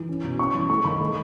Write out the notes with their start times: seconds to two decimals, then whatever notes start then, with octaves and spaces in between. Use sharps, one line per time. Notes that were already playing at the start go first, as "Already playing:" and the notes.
Already playing: E3
0.09 C#4
0.24 B2
0.39 C#4 C#6
0.54 E3
0.69 A3 C#6
0.85 D#3 B5
1.00 A3